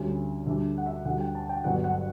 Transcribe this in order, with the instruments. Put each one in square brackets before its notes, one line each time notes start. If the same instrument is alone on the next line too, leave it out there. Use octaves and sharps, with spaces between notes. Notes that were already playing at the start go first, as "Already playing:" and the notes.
Already playing: [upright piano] D2 D3 G3 C#4
D2 D3 G3 D4 E5
F#5
E5
D2 D3 G3 F#5
G5
A5
G5
G1 G2 F#3 F#5
F#5